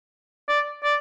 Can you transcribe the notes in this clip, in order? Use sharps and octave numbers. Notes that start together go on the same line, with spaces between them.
D5
D5